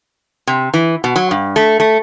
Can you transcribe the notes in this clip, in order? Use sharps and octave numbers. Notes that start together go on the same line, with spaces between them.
C3
E3
B2
F#3
G2
A3
A3